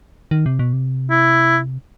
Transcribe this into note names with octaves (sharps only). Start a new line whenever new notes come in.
D#3
C3
B2
C3
E4